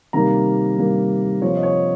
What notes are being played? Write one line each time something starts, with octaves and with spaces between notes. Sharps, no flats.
C3 D#3 G3 A#3 A#5
C3 D#3 G3 A#3
C3 F3 A#3 C#5
D#5
C#5